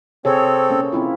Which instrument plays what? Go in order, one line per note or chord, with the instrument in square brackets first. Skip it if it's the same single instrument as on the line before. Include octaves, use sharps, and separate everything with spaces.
[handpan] C3 G#4 C#5 [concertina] C4 A4
[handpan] A#3 C#4
C4 E4 F4